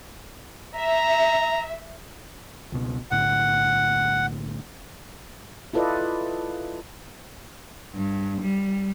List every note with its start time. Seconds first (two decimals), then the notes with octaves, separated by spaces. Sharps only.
0.75 E5 A#5
2.72 C#2 B2
3.11 B1 A2 D3 F#5
5.73 E4 F4 A4 B4 D5 D#5
7.94 G2
8.41 G3